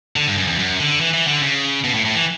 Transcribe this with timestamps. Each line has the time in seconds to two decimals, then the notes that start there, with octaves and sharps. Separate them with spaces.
0.16 D3
0.28 G2
0.38 F#2
0.47 E2
0.59 F#2
0.80 D3
1.01 E3
1.13 E3
1.27 D3
1.42 C#3
1.84 B2
1.94 A2
2.05 A2
2.15 E3